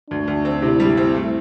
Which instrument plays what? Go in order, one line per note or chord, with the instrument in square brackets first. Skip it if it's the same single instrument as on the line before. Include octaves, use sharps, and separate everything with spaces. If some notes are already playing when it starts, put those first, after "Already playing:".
[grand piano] D2 [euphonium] D4
[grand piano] D2
C4
[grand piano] C3 [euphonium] E4
[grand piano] G3
C4
A3